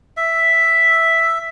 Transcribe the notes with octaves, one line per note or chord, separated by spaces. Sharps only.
E5